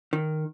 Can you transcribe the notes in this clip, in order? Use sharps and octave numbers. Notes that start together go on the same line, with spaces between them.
D#3